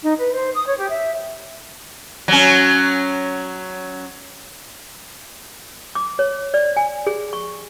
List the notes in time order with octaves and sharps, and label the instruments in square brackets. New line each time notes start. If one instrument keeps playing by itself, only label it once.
[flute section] D#4
B4
C5
D#6
C#5
G4
E5
[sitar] F#3 C#4
[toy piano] D6
C#5
D5
G#5
G#4
C#6